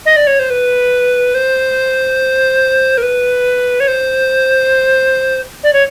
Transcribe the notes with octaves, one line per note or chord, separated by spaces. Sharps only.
D#5
D5
C#5
C5
B4
C5
A#4
B4
C#5
C5
D5
C#5